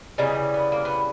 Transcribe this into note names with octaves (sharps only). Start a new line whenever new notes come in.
C#3 E3 G3 D#4
B3
A#3
B3